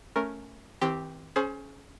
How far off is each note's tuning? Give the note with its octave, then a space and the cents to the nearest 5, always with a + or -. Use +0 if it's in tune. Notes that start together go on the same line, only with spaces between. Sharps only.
A3 +0 C#4 +0 A#4 +0
E3 -40 C4 +0 G4 +0
C#4 +0 G#4 +35 C5 +0